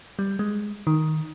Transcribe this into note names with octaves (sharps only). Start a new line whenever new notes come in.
G3
G#3
D#3